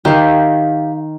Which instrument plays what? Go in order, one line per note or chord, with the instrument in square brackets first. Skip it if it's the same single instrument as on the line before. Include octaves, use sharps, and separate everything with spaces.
[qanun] D#3 [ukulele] G4 F5